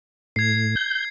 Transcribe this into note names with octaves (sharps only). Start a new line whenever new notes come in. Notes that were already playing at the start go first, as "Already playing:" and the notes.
A2 G#6 C7
G6